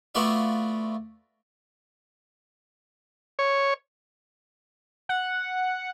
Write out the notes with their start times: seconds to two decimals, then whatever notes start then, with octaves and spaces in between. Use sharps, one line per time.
0.15 A3 B3 F4 F#4 D5 E5
3.39 C#5
5.09 F#5